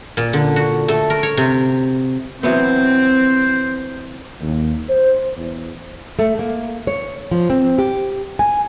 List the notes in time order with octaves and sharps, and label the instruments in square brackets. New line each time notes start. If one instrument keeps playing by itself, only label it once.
[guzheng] A#2
D3
F#4
A3
A#4
C#5
C3
[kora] E3 F#3 B3 [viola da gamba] C4 [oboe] C5
[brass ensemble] D#2
C5
E2
[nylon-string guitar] A3
A#3
C#5
F3
C4
G4
G#5